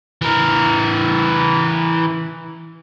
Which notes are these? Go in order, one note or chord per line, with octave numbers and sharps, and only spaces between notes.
E3 A#4